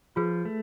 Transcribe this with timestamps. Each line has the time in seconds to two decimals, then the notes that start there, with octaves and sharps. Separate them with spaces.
0.16 F3 F4 G#4 B4
0.45 A3